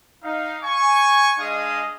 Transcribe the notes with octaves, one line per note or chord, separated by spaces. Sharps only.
D#4 F5
G#5 C#6
G#3 D4 G#4 D#5 F5 D#6